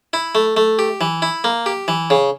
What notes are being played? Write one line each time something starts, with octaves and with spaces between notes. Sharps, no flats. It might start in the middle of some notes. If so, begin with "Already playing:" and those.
E4
A3
A3
G4
E3
E4
A#3
G4
E3
C#3